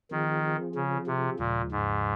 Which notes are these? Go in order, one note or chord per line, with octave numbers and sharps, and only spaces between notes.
D#3 F3 C4 F4 G#4
C#3
C3
D#2 A#2 C#3 F3 G#3
G#2